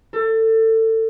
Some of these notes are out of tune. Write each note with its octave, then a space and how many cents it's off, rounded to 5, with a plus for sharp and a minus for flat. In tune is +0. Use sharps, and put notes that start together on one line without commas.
A4 +25